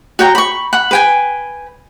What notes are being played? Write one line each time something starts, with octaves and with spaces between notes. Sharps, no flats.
F#4 C#5 G5 A#5
B5 C#6
F#5 B5
B4 G5 G#5